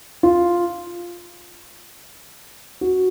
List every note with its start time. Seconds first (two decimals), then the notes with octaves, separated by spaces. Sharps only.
0.23 F4
2.81 F#4